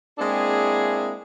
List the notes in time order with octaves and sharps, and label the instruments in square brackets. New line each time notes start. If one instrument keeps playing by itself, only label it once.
[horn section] G#3 A#3 C4 D4 E4 G#4